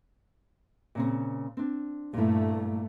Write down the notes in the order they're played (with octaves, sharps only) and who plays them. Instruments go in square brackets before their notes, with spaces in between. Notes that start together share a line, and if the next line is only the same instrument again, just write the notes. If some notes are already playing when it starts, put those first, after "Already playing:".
[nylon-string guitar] A#2 C#3 C4
C4 D4
[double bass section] G2 A3 [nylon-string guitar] A#2 E4